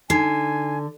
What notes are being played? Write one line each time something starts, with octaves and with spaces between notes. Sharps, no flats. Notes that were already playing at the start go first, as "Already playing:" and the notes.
D3 D#4 G#5 C7